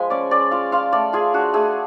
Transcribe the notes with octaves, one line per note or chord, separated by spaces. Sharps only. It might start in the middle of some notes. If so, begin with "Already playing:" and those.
Already playing: F3 G#3 G#5 B5
C#4 D5
C#4 D5
F4 F5
F4 F5
A3 D5
F4 G#4
D4 F#4
A3 G#4